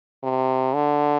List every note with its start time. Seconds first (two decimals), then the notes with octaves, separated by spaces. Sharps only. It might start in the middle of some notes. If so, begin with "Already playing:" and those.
0.24 C3
0.75 D3